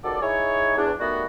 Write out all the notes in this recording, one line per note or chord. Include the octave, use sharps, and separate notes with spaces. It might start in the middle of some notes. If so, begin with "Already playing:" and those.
C#2 D#3 F#4 A4 D5
D#4 E4 G#4 C#5
E2 D4
D#3 G3 A3 B3 F#4